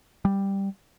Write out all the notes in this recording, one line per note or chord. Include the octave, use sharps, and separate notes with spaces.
G3